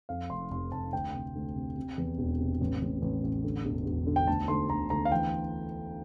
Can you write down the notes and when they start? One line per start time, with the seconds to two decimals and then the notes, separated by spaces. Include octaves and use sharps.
0.09 F2 F5
0.30 F1 C6
0.50 F1 C6
0.72 F1 A5
0.93 D2 G5
1.14 C3
1.35 D2
1.55 C3
1.76 C3
1.98 E2
2.18 E1
2.39 C3
2.61 A1
2.81 A1
3.02 A1
3.24 A1
3.44 D3
3.65 E1
3.86 E1
4.07 D3
4.16 G5
4.27 D2 A5
4.48 D2 C6
4.70 D2 A#5
4.90 D2 A#5
5.05 F5
5.11 E3 G5